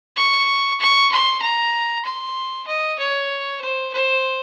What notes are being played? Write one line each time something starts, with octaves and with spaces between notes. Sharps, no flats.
C#6
C#6
C6
A#5
C6
D#5
C#5
C5
C5